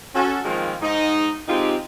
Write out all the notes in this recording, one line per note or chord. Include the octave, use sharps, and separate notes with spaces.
C#4 F#4 A4
D#3 F3 G#3 A#3 C4 F4
G#2 D#4
G#3 C4 D#4 F4 G4